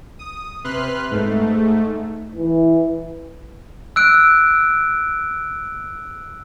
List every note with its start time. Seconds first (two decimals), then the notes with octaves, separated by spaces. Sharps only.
0.19 D#6
0.64 C3 B4 C6 F6 F#6
1.11 G#2 A3
2.35 E3
3.96 E6 F#6 D7